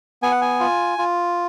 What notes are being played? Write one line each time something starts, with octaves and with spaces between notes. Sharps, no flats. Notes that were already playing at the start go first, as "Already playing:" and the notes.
B3 G#5
F#5
G#5
F4
F4